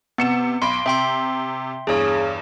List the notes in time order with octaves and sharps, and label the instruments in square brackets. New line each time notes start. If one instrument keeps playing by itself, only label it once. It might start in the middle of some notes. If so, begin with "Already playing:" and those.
[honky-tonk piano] C3 C#7 E7 [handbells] B3
[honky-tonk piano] B1 B5 D7 [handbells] C6
[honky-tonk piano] C3 [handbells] E5 G5 C6
[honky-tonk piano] E2 G2 [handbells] G#4 C#5